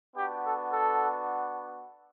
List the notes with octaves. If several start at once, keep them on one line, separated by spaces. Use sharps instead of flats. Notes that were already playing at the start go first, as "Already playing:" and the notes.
B3 D4 F#4 G4
A4
A4